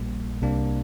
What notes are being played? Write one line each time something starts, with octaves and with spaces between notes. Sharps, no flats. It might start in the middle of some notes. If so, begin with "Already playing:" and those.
Already playing: A#1 A#2 G3 A#3
C2 C3 A#3 D4